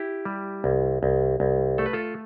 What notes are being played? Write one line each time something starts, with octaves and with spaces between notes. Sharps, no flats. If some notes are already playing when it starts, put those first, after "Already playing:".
Already playing: E4 G4
G3
C2
C2
C2
A3 A4
B4
F4 A4